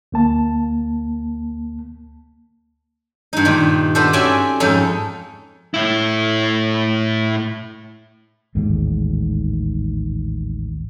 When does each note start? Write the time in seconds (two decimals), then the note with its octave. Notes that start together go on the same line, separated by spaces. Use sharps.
0.12 D2 A#3 A5
3.33 G2 D#4
3.45 A#2 D#3
3.95 B3 D4 A4 C5
4.13 C4 C#4 F#4 D5 E5 G#5
4.60 F2 G#2 C#4 D#4 A4
5.74 A2 E4
8.55 A1 D#2 G#2